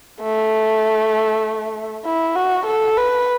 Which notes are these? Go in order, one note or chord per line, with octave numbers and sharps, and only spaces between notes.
A3
E4
F#4
A4
B4